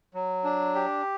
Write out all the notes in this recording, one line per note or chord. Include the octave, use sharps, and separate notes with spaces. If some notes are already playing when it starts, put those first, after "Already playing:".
F#3
D4
G4